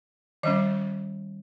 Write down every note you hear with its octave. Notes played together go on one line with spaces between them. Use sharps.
D#3 G3 C#4 D#5